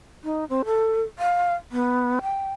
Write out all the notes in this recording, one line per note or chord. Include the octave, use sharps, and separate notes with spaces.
D#4
C4
A4
F5
B3
G5